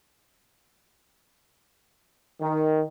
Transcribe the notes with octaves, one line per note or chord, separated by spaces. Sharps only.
D#3